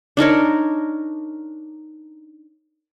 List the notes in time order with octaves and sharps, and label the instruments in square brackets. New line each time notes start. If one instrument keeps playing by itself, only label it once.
[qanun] D4 D#4 A#4 C#5